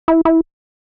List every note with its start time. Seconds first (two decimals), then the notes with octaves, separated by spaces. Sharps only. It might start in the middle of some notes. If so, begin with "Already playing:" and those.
0.08 E4
0.25 E4